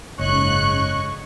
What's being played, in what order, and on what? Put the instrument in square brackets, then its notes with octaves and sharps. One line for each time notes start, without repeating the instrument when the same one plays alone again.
[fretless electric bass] F#1 [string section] G#2 C#3 F#6 [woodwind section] C#5 D#5 C#6